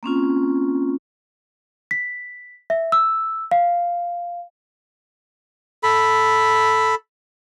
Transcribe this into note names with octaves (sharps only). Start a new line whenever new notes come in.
A#3 C4 C#4 F4
B6
E5
E6
F5
A4 B5